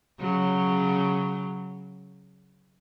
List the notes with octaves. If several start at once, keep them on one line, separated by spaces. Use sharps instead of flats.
C#3 F#3